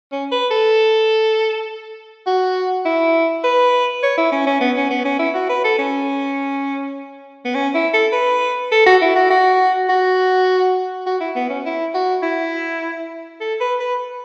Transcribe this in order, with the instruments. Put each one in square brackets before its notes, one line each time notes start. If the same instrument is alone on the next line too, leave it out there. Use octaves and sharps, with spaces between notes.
[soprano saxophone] C#4
B4
A4
F#4
E4
B4
C#5
E4
C#4
C#4
B3
C#4
B3
C#4
E4
F#4
B4
A4
C#4
B3
C#4
E4
A4
B4
A4
F#4
E4
F#4
F#4
F#4
F#4
E4
B3
C#4
E4
F#4
E4
A4
B4
B4